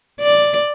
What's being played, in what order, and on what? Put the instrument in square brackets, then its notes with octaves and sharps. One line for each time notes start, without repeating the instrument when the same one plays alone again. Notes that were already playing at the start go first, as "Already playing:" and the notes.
[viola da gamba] D5